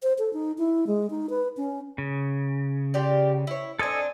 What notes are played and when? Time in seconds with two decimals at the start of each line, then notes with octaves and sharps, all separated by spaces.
0.03 C5
0.19 A4
0.33 D#4
0.58 E4
0.87 G#3
1.10 D#4
1.30 B4
1.57 C#4
1.98 C#3
2.94 F4 G4 D5
3.47 E4 C#5
3.79 C4 D4 A4 D#5 G#5